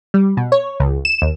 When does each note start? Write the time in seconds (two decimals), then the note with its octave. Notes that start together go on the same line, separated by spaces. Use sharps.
0.14 G3
0.37 B2
0.52 C#5
0.80 C#2
1.05 E7
1.22 D#2